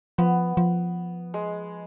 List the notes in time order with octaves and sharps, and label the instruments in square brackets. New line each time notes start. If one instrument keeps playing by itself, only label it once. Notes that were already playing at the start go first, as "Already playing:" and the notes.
[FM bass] F3 [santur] B3
[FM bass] F3
[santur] G#3